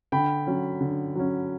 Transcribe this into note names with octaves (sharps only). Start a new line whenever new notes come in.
D3 G5 B5
F#3 C#4
D3
F#3 C#4